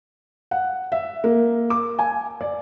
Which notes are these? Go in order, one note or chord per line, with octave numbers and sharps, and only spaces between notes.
F#5
E5
A#3
D6
G#5
D5